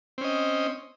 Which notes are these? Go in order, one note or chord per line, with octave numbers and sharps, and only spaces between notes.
C4 C#4 D#5